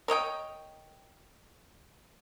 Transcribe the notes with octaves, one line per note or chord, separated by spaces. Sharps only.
A#4 C#5 D#5 G5